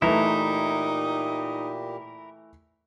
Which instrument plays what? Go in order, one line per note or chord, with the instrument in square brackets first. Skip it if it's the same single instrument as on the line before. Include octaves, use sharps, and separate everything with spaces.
[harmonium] A#2 G4 [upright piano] E3 A3 [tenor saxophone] D#4 [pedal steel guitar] E4 A#4